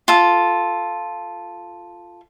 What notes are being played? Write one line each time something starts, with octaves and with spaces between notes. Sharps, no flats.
F4 A4